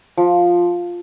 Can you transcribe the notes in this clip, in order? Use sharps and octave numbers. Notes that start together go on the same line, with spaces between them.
F3